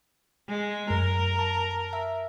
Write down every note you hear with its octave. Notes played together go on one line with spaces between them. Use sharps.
G#3
F#2 A#4
A5
E5